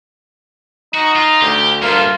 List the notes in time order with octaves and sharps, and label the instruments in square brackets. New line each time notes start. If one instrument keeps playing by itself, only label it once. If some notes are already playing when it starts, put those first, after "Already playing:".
[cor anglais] D#4 [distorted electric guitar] F#4
[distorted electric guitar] F4
[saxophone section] D2 [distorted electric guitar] G4
[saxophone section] D2 A#3 [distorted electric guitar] G2 [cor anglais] F4